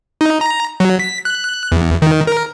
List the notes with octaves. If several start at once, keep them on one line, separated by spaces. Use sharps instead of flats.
D#4
A#5
F#3
B6
F#6
E2
D#3
A#4